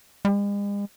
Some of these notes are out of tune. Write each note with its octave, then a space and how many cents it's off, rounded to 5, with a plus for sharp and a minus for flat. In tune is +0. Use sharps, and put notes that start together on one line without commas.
G#3 -45